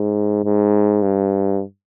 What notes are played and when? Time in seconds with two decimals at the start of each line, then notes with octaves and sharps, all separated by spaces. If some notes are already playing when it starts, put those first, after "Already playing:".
Already playing: G#2
0.44 G#2
1.02 G2